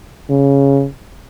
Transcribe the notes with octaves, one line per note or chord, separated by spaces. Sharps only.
C#3